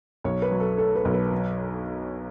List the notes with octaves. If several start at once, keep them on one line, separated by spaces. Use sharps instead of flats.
B1 C#5
B4
F#3
A4
A3 A4
B4
B1
B4
F#3